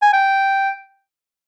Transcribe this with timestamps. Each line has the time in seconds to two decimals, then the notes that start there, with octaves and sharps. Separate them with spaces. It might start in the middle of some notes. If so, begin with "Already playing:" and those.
0.02 G#5
0.13 G5